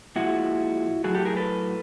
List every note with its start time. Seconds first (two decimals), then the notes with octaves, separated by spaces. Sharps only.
0.16 A#2 F3 G#3 E4 F#4
1.04 A2 F#3 F#4 G#4
1.14 G4 A4
1.25 G#4 A#4
1.37 A4 B4